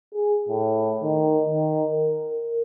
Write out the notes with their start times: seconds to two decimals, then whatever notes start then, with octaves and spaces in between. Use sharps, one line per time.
0.15 G#4
0.49 A2
1.03 D#3
1.49 D#3
1.92 A#4